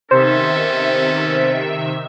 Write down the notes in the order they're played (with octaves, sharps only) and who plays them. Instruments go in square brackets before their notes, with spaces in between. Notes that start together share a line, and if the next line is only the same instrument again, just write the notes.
[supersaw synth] C3 D#3 E5 [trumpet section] B3 C#4 A4 [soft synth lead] C5